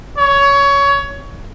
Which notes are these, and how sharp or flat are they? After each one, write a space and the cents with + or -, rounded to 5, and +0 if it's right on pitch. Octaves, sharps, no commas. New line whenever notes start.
C#5 +20